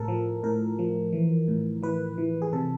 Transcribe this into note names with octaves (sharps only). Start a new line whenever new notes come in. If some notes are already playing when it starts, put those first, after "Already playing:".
Already playing: A2 A4 A#4
F3
A2 A#4
F3
E3
A2
E3 B4
E3
G#4
C3 A4